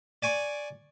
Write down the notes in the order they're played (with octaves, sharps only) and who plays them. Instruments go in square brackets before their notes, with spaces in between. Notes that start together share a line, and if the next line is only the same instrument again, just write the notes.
[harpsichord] D5 G#5 C#6